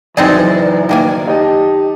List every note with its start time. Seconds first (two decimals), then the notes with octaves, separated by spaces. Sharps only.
0.17 F#1 F#2 E3 C4 D#4 G#4 D5
0.89 D#3 A#3 G#5
1.27 D#4 G4 D#5 A5